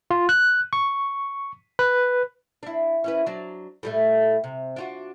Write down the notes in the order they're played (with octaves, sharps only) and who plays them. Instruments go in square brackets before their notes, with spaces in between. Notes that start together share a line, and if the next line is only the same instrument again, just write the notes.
[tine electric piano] F4
F#6
C#6
B4
[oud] D4 E4
C#4 E4 B4
F#3 D4
A2 G3 A3
C3
D4 F4 F#4